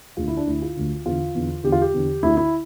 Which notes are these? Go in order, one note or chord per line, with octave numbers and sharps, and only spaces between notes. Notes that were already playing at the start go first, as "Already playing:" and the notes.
D2 D3 F4
E4
D4
D2 D3 E4
F4
D2 D3
E2 D3 F4
E2 D3
E2 D3 G4
F4
G4
E2 D3
D2 D3 E4
E4